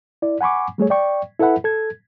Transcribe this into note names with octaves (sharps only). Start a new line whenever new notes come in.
E4 D5
F#5 G#5 B5 C#6 D6
G3 A3 G#4 C#5
D5 G5 C#6
E4 A4 B4 E5 F#5 B5
A4 G#6